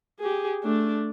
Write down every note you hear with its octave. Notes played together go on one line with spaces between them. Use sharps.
G4 G#4
A3 D4